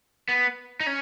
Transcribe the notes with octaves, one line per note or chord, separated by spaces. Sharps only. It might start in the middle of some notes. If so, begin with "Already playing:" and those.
B3
D#4
C#4